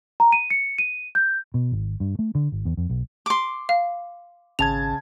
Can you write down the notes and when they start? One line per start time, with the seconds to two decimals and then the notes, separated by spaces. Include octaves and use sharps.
0.20 A#5
0.32 D#7
0.50 C#7
0.78 D#7
1.15 G6
1.54 B2
1.72 G#1
2.00 G2
2.19 A3
2.35 D3
2.52 G#1
2.65 E2
2.77 F2
2.90 B1
3.26 C6 D6
3.69 F5
4.59 G#1 C#3 A5 G#6 F7